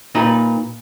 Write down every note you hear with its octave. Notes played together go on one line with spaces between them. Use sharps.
A#2 D#4 B4